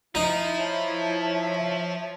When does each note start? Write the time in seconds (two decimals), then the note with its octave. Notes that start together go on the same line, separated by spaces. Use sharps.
0.15 F3 D#4 E4
0.58 C#5 E5 A5